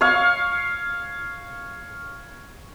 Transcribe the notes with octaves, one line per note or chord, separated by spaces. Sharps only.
C#5 F5